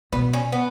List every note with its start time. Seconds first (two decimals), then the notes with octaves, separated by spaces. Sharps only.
0.13 B2 B3
0.33 C#4
0.52 B3